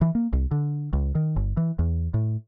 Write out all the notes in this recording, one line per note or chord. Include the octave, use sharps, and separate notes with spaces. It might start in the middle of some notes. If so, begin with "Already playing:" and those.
E3
A#3
C2
D3
C#2
D#3
G1
E3
E2
A2